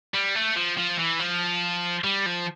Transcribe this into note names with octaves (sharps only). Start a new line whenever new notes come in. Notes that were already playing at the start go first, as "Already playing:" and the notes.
G3
A3
F3
F3
E3
F3
G3
F3